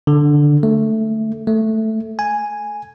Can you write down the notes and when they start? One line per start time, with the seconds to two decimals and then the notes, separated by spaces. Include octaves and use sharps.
0.07 D3
0.63 A3
1.47 A3
2.19 G#5